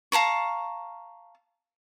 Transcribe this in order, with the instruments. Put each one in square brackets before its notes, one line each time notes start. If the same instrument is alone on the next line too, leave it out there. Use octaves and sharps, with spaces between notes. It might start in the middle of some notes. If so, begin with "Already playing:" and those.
[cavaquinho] F5 A5 A#5 C#6